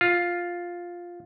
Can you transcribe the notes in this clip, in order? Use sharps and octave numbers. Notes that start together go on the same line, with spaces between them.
F4